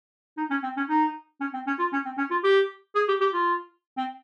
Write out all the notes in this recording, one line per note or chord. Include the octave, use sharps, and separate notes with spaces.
D#4
C#4
C4
C#4
D#4
C#4
C4
C#4
F4
C#4
C4
C#4
F4
G4
G#4
G4
G4
F4
C4